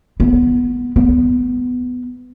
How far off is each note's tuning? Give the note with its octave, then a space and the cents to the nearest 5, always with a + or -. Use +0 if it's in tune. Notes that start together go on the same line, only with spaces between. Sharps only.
B3 -10
B3 +10